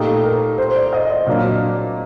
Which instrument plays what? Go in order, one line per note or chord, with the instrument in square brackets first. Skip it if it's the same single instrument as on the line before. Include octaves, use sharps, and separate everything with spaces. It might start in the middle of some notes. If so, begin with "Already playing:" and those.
Already playing: [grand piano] A#2 A3 D#4 [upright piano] G4
[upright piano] A#4
C5
D5
D#5
D5
[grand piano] A#2 F#3 A#3 D4